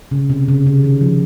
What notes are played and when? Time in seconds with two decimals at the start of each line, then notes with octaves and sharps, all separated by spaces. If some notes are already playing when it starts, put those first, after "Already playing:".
0.11 C#3
0.30 C3
0.49 C#3
0.66 C#3
0.84 D#3
1.01 F3